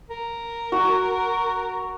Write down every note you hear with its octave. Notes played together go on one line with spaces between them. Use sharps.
A#4
F#4